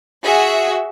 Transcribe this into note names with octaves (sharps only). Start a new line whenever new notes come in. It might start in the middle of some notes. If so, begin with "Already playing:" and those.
F#4 G#4 E5